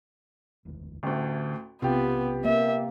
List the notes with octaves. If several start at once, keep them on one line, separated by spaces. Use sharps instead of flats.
D1 G#1 E2
A1 D2 D3
B1 C3 B3 C#4 F4 G4
A#3 E5